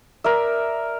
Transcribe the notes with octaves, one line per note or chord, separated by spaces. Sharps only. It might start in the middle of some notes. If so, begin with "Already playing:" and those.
A#4 D5 E5